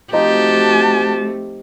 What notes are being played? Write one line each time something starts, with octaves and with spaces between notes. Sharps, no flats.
F3 A3 C4 D#4 F#4 G4 A5